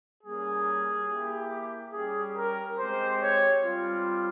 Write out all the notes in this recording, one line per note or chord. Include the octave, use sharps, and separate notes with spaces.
G3 A#3 C#4 G#4
A#3 E4 G4
G3 C#4 G4 G#4
A#4
G#3 C4 G4 C5
C#5
G3 C4 F4